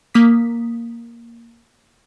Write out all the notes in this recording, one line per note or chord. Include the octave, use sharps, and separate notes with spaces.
A#3 D#6 B6